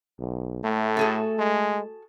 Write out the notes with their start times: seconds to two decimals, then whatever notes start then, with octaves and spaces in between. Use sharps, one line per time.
0.19 B1
0.64 A2 A3
0.97 F#4 G#4 A4
1.39 G#3